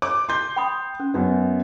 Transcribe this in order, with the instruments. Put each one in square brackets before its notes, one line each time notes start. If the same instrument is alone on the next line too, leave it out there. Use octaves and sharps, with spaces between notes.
[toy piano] C#5 [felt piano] D6
[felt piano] C6 G6
[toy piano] G5 B5 D#6
C#4
[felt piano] F#2 B3